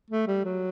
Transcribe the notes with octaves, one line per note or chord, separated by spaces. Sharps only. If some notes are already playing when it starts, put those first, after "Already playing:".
A3
G3
F#3